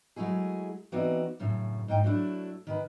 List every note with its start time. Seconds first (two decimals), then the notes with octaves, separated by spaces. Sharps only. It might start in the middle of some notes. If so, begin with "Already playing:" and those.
0.16 F#3 G#3 A3 E4 G#4
0.92 E3 B3 C4 D#4 F#4 D5
1.39 F#2 A2 C#3
1.88 G#2 D#4 G5
2.04 F#3 A3 D4 E4
2.67 D#3 B4